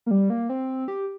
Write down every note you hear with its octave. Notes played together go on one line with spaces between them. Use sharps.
A#3
G3
A#3
C4
G4